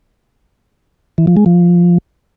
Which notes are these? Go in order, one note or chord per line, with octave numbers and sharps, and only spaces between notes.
E3
F3
G#3
F3